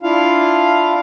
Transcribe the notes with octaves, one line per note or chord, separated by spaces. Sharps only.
D4 E4 F4 F5